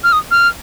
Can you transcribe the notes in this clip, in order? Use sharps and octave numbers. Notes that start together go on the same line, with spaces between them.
F6
D#6
F6